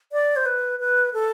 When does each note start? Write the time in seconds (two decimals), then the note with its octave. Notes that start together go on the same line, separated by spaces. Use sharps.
0.12 D5
0.36 C5
0.46 B4
0.80 B4
1.13 A4